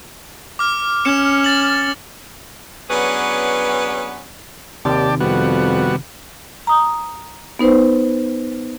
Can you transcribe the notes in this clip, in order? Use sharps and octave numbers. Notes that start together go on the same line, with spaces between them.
D6 F6
C#4 C#7 E7
A6 F#7
F#3 B3 C#4 D4 G#4 B4
D#2 C3 D#3 G4 D5 A5
F2 G3 B3 F#4
A#5 D#6
B3 D#4 B4 C5